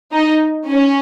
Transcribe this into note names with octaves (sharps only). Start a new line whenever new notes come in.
D#4
C#4